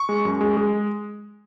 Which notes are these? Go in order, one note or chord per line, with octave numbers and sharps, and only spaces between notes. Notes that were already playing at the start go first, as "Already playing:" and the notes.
Already playing: C#6
G#3
F#2
G#3
G#3